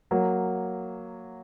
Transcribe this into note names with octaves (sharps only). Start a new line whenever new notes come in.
F#3 A#3